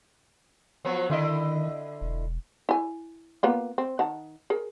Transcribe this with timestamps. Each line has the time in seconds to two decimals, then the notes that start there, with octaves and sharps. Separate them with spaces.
0.85 F3 F#3 B3
1.10 D3 D#3 E4 D#5
2.01 E1
2.69 E4 G#5
3.43 A#3 B3 F4
3.78 C4
3.99 D#3 F#5 A5
4.50 G#4 A#4